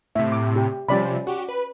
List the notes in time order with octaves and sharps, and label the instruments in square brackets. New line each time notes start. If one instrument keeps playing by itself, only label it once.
[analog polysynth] A2 C3 [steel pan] E5
[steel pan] D6
G4
[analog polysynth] C3 F3 G3 [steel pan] C#4 D5 B5
[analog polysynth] F#4 G4
B4